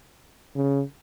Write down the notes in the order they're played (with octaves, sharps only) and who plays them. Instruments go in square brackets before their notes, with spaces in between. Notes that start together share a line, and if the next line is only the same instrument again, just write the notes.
[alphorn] C#3